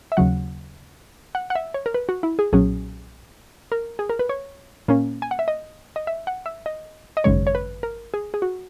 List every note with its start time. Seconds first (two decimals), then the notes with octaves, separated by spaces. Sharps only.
0.12 E5
0.17 D#2 C#3 F#3 F#5
1.35 F#5
1.50 F#5
1.55 E5
1.74 C#5
1.86 A#4
1.94 B4
2.09 F#4
2.23 E4
2.39 G#4
2.53 B1 A#2 F#3 C#4 G#4
3.72 A#4
3.99 G#4
4.10 A#4
4.19 B4
4.29 C#5
4.88 A#2 A#3 C#4
5.22 G#5
5.31 F#5
5.39 E5
5.48 D#5
5.96 D#5
6.07 E5
6.27 F#5
6.46 E5
6.66 D#5
7.17 D#5
7.24 G#1 F#2 C#3 G#3 C#5
7.47 C#5
7.55 B4
7.83 A#4
8.14 G#4
8.34 G#4
8.42 F#4